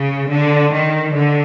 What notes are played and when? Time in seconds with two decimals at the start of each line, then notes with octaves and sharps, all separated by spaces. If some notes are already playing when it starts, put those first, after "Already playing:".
Already playing: C#3
0.29 D3
0.72 D#3
1.13 D3